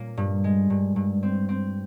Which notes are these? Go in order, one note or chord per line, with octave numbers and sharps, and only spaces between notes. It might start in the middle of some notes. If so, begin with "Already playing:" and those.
Already playing: A#2 A#3 C#4
G2
G#3
G2
G2
C4
C4